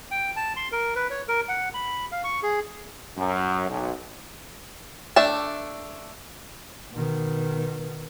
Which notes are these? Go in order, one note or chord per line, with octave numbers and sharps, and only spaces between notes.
G5
A5
C6
A#4
B4
C#5
A#4
F#5
B5
F5
C#6
G#4
F#2
B1
A3 D4 E5 A5
B2 D#3